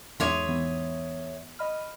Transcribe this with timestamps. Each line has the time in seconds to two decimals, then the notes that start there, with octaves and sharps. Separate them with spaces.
0.20 E2 G#2 G#4 C#5 E5 C6 D6 D#7
0.48 E3 B3
1.59 D#5 B5 F6